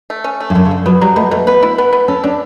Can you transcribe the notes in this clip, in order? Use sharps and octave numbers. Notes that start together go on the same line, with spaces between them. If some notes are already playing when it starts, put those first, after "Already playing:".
A3
C#4
A3
G2
F#2 D3
C#3
D3
F#3 B3
F#3 G3
B2 A3
B2 A3
B3 B4
E4
B3
B3
C#4 A4
C#4 D4